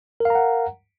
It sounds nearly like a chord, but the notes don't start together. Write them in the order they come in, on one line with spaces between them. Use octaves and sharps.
A#4 F5 A#5 F#5